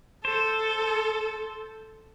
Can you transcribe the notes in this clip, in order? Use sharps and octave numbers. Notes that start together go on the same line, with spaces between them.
A4 C5